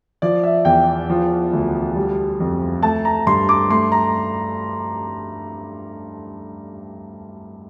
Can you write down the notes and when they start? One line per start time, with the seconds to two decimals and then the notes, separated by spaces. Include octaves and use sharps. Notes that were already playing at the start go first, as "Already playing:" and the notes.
0.22 F3 D5
0.43 E5
0.65 E2 G5
1.10 F3
1.53 D2
1.96 G3
2.40 F2
2.83 A3 A5
3.05 A#5
3.27 G2 C6
3.49 D6
3.70 A3 C6
3.92 A#5